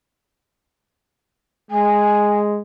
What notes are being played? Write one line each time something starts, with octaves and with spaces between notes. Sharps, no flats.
G#3 G#5